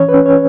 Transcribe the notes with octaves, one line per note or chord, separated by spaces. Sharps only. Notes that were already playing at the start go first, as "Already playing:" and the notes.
Already playing: E3 C#4 C#5
B4
C#4
C#5